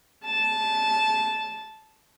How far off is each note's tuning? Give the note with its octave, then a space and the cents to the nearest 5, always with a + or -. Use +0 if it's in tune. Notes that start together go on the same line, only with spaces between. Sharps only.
A5 -15